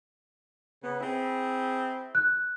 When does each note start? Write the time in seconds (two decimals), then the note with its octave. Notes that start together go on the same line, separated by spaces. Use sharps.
0.82 C#3 B3
1.01 C4 E4 G#4
2.15 F#6